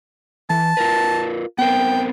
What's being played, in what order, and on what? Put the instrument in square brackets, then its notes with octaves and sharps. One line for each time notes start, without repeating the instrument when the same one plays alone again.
[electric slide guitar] E3 [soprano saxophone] A5
[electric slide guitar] F4 A#4 B4
[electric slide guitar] B3 C4 A#4 [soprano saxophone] G5